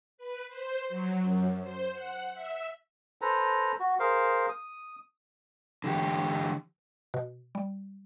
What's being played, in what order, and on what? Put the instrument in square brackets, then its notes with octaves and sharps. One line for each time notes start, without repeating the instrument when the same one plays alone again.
[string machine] B4
C5
F#3
F#2
C5
F#5
E5
[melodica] A4 B4 C5 A#5
F#4
G#4 A#4 C5 F5
D#6
[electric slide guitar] D3 E3 G4
[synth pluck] B2
G3